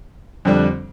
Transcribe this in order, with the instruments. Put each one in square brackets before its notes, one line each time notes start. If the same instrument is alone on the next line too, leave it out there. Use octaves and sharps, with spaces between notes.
[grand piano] F2 D3 G3 D4